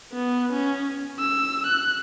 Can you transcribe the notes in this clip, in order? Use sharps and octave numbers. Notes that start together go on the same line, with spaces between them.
B3
C#4
E6
F#6